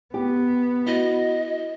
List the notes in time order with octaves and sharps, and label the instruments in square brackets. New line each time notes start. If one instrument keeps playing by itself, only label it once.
[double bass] B3 [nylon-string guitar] G4
[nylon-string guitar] E4 [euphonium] F#4 [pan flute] D#5